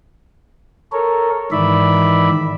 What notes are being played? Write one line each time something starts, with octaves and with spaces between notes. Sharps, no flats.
A4 A#4 C#5
G#2 D#3 E3 D5 E5 B5